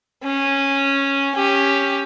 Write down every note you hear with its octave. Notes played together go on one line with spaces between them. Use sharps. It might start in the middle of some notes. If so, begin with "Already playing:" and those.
C#4
C#4 G4